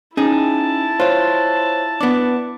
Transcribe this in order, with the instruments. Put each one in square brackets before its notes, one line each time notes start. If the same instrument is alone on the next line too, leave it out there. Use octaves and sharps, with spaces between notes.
[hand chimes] C#4 [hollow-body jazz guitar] D#4 G#4 [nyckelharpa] E4 A5
[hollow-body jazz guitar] F4 [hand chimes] C5 C#5
[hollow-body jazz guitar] B3 D4 [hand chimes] D6